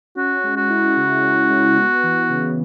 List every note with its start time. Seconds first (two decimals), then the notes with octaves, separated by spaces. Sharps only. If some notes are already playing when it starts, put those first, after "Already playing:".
0.16 C#4 F#4
0.44 G#3
0.56 F#4
0.70 E4
0.97 C#3
1.23 C#4
1.50 G#3
1.77 B3
2.03 E3
2.30 C#3